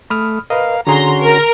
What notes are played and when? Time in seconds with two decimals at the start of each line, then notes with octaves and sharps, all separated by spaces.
0.10 A3 B5 D#6 F6
0.50 A#4 B4 D#5 F5
0.87 D3 C#4 F#4 G#4 A#5 C6
1.21 A#4